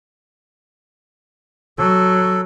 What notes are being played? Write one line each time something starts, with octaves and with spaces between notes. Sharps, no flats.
F#3 A4